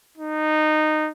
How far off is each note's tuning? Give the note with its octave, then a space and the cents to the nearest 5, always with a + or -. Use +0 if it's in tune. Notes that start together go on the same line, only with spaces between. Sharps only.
D#4 -15